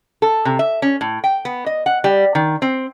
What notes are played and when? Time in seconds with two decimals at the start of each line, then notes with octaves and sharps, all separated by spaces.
0.22 A4
0.45 C3
0.59 E5
0.82 C#4
1.01 A2
1.24 G5
1.45 B3
1.66 D#5
1.86 F#5
2.04 G3
2.35 D#3
2.62 C4